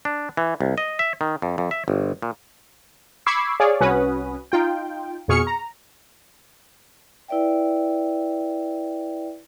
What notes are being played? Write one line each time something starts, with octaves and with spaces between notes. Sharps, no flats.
D4
E3
C2
D#5
E5
D#3
F2
F2
E5
G1
A#2
B5 C#6 D6 E6 G#6 C7
G#4 C#5 D5 F5
C2 C#4 F#4 B4 D#6
D#4 F4 G5
F2 B2 G#4 C#6 F6 C#7
A#5
E4 B4 D5 E5 G5